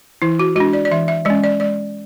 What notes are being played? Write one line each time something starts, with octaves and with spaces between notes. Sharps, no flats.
E3 E4
F#4
G#3 D4 F#4
D5
D5
E3 E5
E5
G#3 C#4 D5
D5
G#3 D5